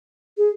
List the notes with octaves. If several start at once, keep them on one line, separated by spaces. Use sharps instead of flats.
G#4